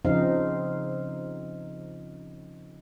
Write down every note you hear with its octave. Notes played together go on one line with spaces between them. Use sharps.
C#3 F3 C4 D#4 F5